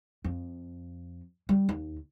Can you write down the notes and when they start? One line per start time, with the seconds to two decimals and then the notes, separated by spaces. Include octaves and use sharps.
0.24 F2
1.49 G3
1.69 D#2